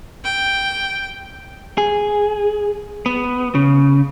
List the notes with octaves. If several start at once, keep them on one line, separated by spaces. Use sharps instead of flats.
G5
G#4
B3
C#3